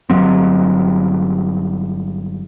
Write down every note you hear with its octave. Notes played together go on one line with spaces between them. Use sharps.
G1 F#2 F#3 C4